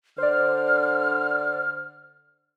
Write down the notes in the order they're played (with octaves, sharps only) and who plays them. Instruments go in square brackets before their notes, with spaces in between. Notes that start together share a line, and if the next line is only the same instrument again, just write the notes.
[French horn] D3 [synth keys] C5 D5 [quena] F6